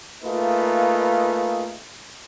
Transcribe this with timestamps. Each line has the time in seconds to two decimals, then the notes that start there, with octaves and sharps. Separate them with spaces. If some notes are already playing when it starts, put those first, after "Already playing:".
0.24 A3 A#3 D#4 F4 G#4 B4